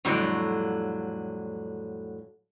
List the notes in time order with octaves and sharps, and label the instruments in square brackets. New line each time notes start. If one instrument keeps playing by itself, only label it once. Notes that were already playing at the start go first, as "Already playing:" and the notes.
[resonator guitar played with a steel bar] F2 A2 D3 F#3 G3